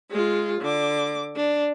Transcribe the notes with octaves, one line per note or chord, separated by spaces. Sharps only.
G#3 F4
D3 D6
D4